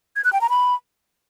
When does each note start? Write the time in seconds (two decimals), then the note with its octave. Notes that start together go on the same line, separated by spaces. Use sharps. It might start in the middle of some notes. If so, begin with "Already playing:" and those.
0.16 G#6
0.24 F#6
0.33 G5
0.41 A#5
0.50 B5